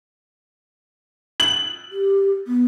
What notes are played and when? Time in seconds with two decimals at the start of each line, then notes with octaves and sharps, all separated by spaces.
1.40 F#7
1.92 G4
2.47 B3